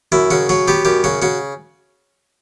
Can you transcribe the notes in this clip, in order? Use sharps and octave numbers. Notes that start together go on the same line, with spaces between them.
F#2 E4
C#3 F#4
F#3 F#4
B3 G4
F#2 G4
C#3 F#4
C#3 F#4